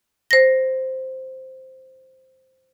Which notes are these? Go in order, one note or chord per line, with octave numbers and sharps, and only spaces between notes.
C5 A#6